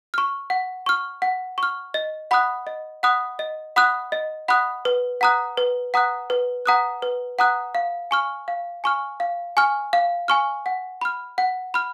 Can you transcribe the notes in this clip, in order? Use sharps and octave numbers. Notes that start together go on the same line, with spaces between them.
C#6 F6
F#5
C#6 F6
F#5
C#6 F6
D#5
F#5 B5 D#6 F#6
D#5
F#5 B5 D#6 F#6
D#5
F#5 B5 D#6 F#6
D#5
F#5 B5 D#6 F#6
B4
F#5 A#5 D#6 F#6
B4
F#5 A#5 D#6 F#6
B4
F#5 A#5 D#6 F#6
B4
F#5 A#5 D#6 F#6
F5
G#5 C#6 F6
F5
G#5 C#6 F6
F5
G#5 C#6 F6
F5
G#5 C#6 F6
F#5
B5 F6
F#5
B5 F6